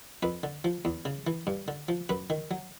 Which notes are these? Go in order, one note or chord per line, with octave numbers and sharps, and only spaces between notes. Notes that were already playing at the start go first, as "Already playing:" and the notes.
F2 B4
D3
F3
E2
C#3
E3
G2
D3
F3
F#2 B4
D#3
F#3